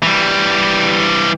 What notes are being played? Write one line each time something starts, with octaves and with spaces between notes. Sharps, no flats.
E3 G3